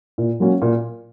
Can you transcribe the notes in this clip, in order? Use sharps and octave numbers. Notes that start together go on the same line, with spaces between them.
A#2
F#3 A#3 C#4 F#4
A#2